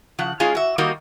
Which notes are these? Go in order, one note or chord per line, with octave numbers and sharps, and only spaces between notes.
C#3 F3 F#5
G#3 C#4 F4 G#4
F#4 E5
D#3 G3 A#3 F#4 D#5